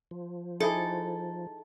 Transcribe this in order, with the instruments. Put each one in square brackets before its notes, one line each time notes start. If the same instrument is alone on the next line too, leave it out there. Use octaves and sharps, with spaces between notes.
[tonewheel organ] F3
[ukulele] D#4 E4 G#4 [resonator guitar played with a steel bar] A4